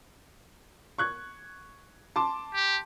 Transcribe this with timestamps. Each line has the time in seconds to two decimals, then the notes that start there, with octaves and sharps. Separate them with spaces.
0.98 C#6 F#6 G#6
2.16 A5 C6 D6
2.55 G4